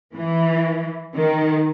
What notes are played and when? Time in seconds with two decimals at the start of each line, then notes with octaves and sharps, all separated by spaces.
0.14 E3
1.14 D#3